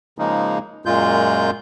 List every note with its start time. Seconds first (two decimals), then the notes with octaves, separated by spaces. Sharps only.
0.18 C#3 F3 G#3 A#3 D#4
0.86 F#2 A#2 G#3 F4 G6